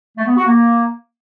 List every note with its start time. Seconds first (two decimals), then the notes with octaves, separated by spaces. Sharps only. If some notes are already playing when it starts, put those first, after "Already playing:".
0.18 A3
0.27 B3
0.36 F#4
0.46 A#3